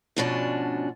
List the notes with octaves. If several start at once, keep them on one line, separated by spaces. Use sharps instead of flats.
D2 G#2 B2 F3 C#4 D4